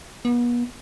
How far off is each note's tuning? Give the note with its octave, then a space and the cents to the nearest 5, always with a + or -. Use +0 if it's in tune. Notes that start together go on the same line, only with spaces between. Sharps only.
B3 -40